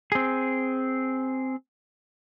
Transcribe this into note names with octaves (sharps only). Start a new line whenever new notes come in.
C4 G#4